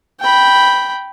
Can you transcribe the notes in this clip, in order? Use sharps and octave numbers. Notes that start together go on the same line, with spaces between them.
G5 B5